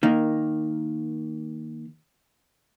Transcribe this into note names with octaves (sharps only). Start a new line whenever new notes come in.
D#3 A#3